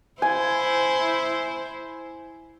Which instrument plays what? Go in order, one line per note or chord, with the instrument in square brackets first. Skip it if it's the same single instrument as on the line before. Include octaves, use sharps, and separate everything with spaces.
[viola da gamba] E4 C5 [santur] G#5